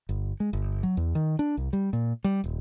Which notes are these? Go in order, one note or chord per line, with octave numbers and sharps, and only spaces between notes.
G1
G#3
G1
F#3
E2
D#3
D4
C2
G3
A#2
G3
D#1